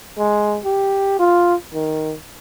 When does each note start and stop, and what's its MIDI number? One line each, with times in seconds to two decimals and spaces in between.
0.18 0.58 56
0.65 1.19 67
1.19 1.55 65
1.74 2.14 51